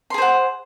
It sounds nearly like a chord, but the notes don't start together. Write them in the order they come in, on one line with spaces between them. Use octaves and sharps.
C6 G#4 C5 F#5